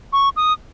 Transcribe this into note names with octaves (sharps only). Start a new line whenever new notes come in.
C#6
D#6